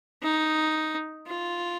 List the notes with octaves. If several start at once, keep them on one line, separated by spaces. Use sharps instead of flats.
D#4
F4